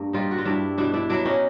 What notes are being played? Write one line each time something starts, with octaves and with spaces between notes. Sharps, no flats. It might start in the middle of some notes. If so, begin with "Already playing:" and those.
Already playing: G2 A#3
G3 D#4 F4
F#4
F4
G2 D4 E4
B2 D4 E4
D4 E4
F#3 D4 E4
C#4 D#4